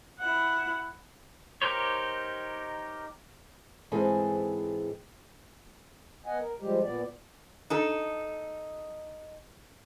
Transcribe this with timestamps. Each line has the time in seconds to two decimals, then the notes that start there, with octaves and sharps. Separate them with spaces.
0.19 E4 F#5
1.62 D#4 G4 A#4 C5 C#5
3.92 G#2 E3 C4 G#4 A4
6.26 B3 D#5 F#5 G#5
6.39 A#4
6.60 F3 G3 G#3 G4
6.82 A#2 B3 D5
7.70 D#4 A4